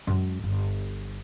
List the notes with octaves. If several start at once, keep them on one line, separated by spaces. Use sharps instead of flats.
F#2 G#3
G1